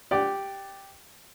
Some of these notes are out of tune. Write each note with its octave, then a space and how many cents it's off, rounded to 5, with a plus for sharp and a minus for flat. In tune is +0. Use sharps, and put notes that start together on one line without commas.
G4 +0 D5 +0 F#5 +30